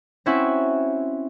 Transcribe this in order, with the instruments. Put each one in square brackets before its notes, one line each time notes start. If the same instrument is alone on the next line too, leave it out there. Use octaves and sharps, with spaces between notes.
[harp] C4 C#4 E4 F#4 E5